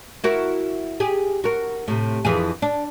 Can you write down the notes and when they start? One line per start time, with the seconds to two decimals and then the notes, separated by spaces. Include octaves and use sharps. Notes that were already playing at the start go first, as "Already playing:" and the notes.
0.24 E4 F#4 A#4
1.00 G4 G#4
1.44 F#4 A#4
1.88 A2 C3
2.25 F2 E3 G#4
2.62 D4